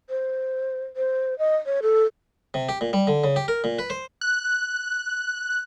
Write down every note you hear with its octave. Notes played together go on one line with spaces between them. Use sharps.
C5
C5
D#5
C#5
A4
C3
G4
A#2
G3
D3
C#3
G4
A#4
A#2
B4
C5
F#6